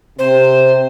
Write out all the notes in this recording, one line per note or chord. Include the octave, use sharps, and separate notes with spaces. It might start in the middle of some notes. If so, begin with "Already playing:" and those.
C3 C5